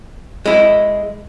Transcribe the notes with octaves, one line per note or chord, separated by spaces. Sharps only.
G#3 E4